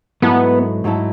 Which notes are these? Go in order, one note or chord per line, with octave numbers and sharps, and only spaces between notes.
G#2 F#3 A3 B3 E4 A4
G#2 F#3 A3 E4 A4